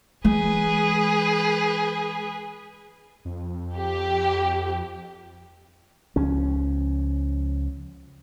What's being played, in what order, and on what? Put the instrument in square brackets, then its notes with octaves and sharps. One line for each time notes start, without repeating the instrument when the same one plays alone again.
[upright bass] E3 G#3 [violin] G#4 B4
[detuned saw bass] F2
[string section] G4
[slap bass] C#2 F3 C#4